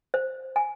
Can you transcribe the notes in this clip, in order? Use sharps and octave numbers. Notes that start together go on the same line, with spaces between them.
C5
G#5